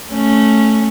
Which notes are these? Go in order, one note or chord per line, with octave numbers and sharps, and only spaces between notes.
A3 C#4